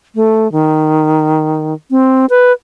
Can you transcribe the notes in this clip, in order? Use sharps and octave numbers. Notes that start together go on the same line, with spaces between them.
A3
D#3
C4
B4